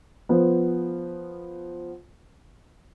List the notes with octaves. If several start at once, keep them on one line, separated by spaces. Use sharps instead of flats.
F3 B3